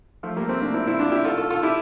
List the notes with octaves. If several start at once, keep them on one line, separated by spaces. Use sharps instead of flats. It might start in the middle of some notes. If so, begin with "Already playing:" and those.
F3 A3
G3 A#3
A3 C4
A#3 D4
C4 E4
C4 E4
D4 F4
E4 G4
F4 A4
F4 A4
F4 A4
E4 G4